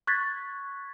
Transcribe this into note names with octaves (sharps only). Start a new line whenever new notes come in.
C#6 F#6 G#6 A6 B6